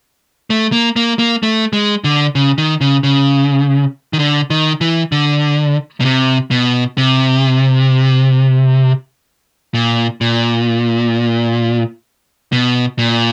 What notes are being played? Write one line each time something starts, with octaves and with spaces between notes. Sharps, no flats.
A3
A#3
A#3
A#3
A3
G#3
D3
C#3
D#3
C#3
C#3
D#3
D3
D#3
E3
D3
B2
C3
B2
C3
A#2
A#2
B2
A#2